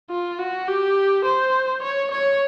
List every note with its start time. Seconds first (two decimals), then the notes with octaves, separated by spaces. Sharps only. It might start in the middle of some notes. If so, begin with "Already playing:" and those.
0.10 F4
0.39 F#4
0.68 G4
1.25 C5
1.83 C#5
2.11 C#5